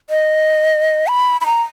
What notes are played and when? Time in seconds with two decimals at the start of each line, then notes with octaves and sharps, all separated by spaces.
0.10 D#5
1.07 B5
1.41 B5
1.46 A#5